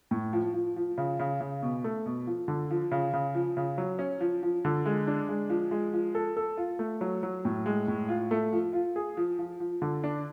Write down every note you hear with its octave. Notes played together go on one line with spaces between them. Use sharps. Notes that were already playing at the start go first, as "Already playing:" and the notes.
A2
F3
F3
F3
C#3
C#3
C#3
B2
A3
B2
F3
D3
F3
C#3
C#3
F3
C#3
F#3
C#4
F3
F3
D3
G#3
D4
G#3
F3
G#3
F3
A4
A4
F4
A3
F#3
F#3
A2
G#3
A2
F4
A3
F3
F4
G#4
F3
F3
F3
D3
D4